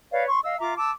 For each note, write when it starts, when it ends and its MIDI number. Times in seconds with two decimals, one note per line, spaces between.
0.12 0.27 71
0.12 0.27 73
0.12 0.27 74
0.12 0.27 77
0.28 0.39 84
0.28 0.39 85
0.43 0.59 75
0.43 0.59 77
0.43 0.59 88
0.59 0.74 65
0.59 0.74 76
0.59 0.74 82
0.59 0.74 86
0.77 0.90 81
0.77 0.90 86
0.77 0.90 88